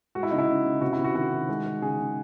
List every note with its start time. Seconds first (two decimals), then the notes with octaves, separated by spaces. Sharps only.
0.15 G#3 F#4
0.23 E4
0.31 C#3 D#4
0.38 E4
0.48 C#3
0.65 C#3
0.81 C3 F#4
0.93 E4
0.99 C3
1.04 F#4
1.14 D#3 F#4
1.32 D#3
1.49 G#3
1.65 G#3
1.81 C#3 G#4
1.98 C#3